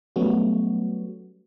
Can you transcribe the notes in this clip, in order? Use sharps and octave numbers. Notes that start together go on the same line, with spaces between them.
F#3 G3 A3 B3 C#4 F#4